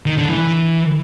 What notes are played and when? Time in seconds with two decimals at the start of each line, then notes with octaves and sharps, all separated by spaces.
0.06 D#3
0.18 D3
0.30 E3